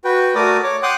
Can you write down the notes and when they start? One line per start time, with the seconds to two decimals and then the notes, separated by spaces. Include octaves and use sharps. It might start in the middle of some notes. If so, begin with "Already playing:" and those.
0.05 F#4 B4 G5
0.35 A3 F#4 A#4 D5 D6 D#6
0.63 C#5 D6
0.83 F#5 G5 C6 D6 D#6 F#6